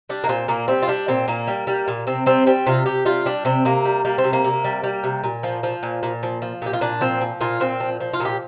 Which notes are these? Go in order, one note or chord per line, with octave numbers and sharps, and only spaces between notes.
G3 D4
A#3
A#2 C4
A#2 A#3
G3 C4
F4
G3 D4
A#2 C4
A#2 A#3
G3
G3
A#2
C3 C4
G3 C4
G3 C4
C3 F4
C3 G4
G3 F4
G3 D4
C3 C4
C3 A#3
G3
G3 A#3
C4
C3
A#3
C3
G3
G3
C3
A#2
F3
F3
A#2
A#2
F3
F3
A#2 G4
F4
A#2 D4
F3 C4
F3
A#2 F4
A#2 C4
F3
F3
F4
A#2 G4